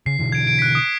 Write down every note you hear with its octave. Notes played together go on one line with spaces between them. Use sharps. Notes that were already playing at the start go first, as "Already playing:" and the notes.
C#3 C7
B2 D3 E3
G#6 D7
D7
F#6 B6
D#6